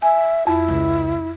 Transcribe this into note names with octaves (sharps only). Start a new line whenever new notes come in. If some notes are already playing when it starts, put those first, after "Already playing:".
E5 G#5
F2 E4
C#2